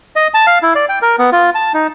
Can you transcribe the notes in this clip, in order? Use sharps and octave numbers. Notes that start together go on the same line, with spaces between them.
D#5
A5
F5
E4
D5
G5
A#4
B3
F4
A5
D#4